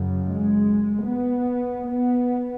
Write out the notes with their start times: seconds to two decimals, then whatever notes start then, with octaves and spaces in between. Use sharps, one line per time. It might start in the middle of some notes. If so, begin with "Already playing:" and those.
Already playing: F#2 C#3
0.26 G#3
1.07 B3
1.87 B3